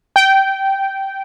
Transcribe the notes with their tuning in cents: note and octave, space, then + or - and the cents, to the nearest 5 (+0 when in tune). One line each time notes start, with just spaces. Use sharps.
G5 -15